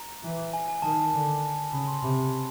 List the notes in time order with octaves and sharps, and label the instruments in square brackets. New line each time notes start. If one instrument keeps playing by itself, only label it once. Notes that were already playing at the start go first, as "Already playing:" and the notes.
Already playing: [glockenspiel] A#5
[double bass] E3
[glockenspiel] G#5
G#5
[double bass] D#3 [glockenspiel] A5
[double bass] D3
[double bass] C#3 [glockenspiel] B5
[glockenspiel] C6
[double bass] C3 [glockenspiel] B5